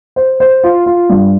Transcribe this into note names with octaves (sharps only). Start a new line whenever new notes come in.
C5
C5
F4
F4
G2